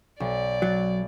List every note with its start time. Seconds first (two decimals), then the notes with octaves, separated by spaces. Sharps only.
0.20 B1 D5
0.62 F#3 A6